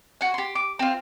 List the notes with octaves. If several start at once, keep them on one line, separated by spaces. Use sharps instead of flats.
F#4 G#5
G4 C6
D6
C4 F4